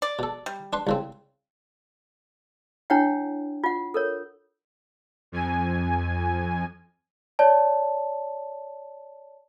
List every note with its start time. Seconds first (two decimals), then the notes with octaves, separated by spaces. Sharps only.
0.02 D5
0.19 B2 A4
0.46 G3
0.73 D4 B4 C6
0.87 C2 C#3 C4
2.90 D4 E4 C#5 F#5 G5
3.64 F4 F#5
3.94 A4 A#4 C#5
5.32 F2 G#5
7.39 C#5 D5 A5